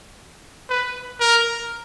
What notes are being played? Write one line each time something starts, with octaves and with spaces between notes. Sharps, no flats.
B4
A#4